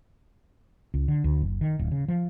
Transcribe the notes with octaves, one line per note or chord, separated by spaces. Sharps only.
C#2
D3
D2
F#1
D#3
D1
C#3
F3